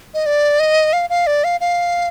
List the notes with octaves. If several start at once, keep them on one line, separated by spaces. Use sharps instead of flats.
D#5
D5
D#5
F5
F5
D5
F5
F5